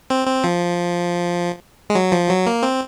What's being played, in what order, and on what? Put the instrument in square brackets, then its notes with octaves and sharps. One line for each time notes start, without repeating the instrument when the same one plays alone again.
[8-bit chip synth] C4
C4
F3
G#3
F#3
F3
F#3
A#3
C4